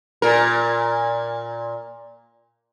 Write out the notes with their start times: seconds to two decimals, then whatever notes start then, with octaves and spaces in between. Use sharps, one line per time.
0.22 A#2 A#4